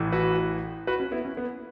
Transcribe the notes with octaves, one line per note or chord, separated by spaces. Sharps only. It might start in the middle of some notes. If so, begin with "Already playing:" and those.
Already playing: A1 A2 E3
F#4 B4
F#4 B4
C#4
B3 E4
C#4
B3